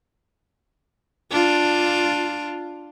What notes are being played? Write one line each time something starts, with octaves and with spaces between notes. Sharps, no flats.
D4 F4